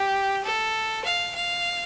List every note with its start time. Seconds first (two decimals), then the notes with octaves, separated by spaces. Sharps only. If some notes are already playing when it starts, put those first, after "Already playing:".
Already playing: G4
0.44 A4
1.04 F5
1.35 F5